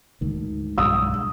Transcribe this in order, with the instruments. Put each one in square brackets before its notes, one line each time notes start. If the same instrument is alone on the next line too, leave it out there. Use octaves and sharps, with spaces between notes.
[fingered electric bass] D2 G#2 D#3
[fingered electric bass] B1 G2 G#3 [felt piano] D#6 E6